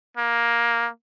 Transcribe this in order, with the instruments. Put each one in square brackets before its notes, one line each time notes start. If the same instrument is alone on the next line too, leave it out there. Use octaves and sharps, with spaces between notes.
[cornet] A#3